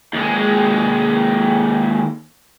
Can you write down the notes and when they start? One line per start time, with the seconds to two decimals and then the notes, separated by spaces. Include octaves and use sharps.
0.13 D#2 G#3